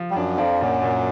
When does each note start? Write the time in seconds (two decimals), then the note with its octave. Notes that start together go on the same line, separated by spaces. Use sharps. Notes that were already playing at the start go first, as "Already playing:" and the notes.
Already playing: F3
0.11 G3
0.15 F#2 F#3 D4
0.38 F2 F3 D4
0.60 F#2 A#2 F#3
0.83 A#2